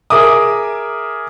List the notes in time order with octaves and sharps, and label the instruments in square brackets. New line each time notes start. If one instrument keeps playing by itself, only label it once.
[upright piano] G#4 A#4 E5 D6 D#6